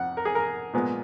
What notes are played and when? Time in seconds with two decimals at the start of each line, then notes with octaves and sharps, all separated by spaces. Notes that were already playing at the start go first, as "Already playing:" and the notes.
Already playing: F2 F#5
0.17 A#4
0.25 G#4
0.35 A#4
0.73 A#2 G#3 B3